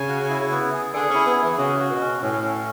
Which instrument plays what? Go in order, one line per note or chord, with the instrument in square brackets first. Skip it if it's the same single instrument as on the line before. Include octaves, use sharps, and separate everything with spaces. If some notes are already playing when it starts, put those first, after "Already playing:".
Already playing: [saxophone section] C#3 [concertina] G#5
[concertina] F#4
E4
B3
G#4
[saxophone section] D3 [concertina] G#4
[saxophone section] C#4 [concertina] E4
[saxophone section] B3
[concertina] G#4
[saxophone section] E3
[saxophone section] C#3 [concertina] F#4
[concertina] F#4
[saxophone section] B2
[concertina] C#4
[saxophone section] A2 [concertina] C#4
[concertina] C#4